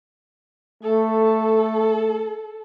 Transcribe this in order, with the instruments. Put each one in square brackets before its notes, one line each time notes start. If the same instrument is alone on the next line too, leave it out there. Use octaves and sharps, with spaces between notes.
[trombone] A3 [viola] A4